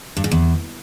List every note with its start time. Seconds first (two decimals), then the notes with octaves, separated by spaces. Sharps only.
0.17 G2
0.24 G#2
0.32 E2